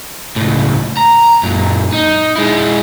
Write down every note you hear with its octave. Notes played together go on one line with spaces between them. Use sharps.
C#2 A2
A#5
F#2 A#2
D#4
G#3 E4